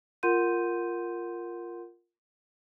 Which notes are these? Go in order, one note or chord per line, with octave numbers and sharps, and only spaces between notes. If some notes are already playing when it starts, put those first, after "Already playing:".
F4 A#4 F#5 C6 G6 D#7